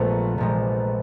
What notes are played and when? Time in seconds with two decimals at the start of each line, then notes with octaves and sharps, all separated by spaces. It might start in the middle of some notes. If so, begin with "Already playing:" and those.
Already playing: A#1 A#2 F3 G#3 A3 B3
0.38 A#1 A#2 F3 G#3